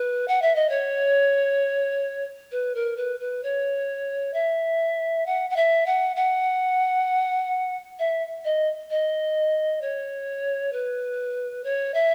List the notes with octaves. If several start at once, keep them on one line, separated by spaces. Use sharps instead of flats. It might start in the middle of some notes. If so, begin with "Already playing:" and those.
Already playing: B4
F#5
E5
D#5
C#5
B4
A#4
B4
B4
C#5
E5
F#5
F#5
E5
F#5
F#5
E5
D#5
D#5
C#5
B4
C#5
E5